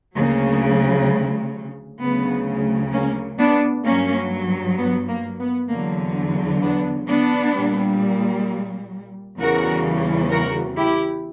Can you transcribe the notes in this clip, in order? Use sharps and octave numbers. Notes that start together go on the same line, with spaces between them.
D2 C#3 F#3 A#3
D2 C#3 F#3 B3
A#3 C#4
B3 D4
G2 F#3 A#3 C#4
B3
A#3
B3
E2 D3 F#3 A#3
B3 D4
B3 D4
A#2 G3
E2 C#3 E3 G3 F#4 A#4
F#4 A#4
E4 G4